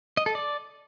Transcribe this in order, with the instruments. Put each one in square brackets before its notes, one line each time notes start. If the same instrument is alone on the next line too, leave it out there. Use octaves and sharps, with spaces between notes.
[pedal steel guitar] D#5
A4
D5